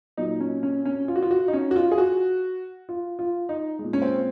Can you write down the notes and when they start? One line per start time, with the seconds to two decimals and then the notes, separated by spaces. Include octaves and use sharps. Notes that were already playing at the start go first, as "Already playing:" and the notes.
0.17 A#2 F#3 D#4
0.40 C#4
0.63 C#4
0.85 C#4
1.08 F4
1.16 F#4
1.22 F4
1.31 F#4
1.48 D#4
1.53 C#4
1.71 F#4
1.76 F4
1.91 G#4
1.98 F#4
2.89 F4
3.19 F4
3.49 D#4
3.79 A#2 G#3
3.93 C#4
4.02 C4